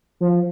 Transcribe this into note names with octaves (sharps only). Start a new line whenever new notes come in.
F3